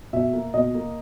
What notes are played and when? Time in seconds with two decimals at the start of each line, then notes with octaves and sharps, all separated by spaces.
0.13 B2 E5
0.33 A#3
0.54 B2 D#5
0.74 A#3